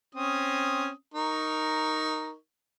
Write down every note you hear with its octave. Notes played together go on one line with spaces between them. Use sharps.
C4 C#4 D#6
D#4 A#4 C#6